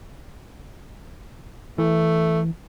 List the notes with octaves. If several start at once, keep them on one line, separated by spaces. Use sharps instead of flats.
E3 A3